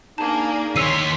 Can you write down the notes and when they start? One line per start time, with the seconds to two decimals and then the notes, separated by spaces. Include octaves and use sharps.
0.18 A#3 D4 D#4 G#4 A5
0.76 D#2 C#5 C6 E6 B6 C7 D#7